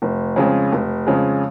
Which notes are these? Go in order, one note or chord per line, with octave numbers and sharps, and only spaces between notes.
F1
F2 C#3 G#3
F1
F2 C#3 G#3